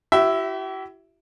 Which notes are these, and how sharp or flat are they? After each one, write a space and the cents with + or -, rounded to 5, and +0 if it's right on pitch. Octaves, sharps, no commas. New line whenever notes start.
E4 +30 G4 -45 E5 +0